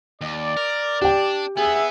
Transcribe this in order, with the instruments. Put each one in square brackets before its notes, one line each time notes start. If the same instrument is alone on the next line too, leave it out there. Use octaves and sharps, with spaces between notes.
[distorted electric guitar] D#2 [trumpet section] D5
[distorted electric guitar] A#4
[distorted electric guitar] D4 [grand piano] G4 G5
[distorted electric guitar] B3 [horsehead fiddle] G#4 [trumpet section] E5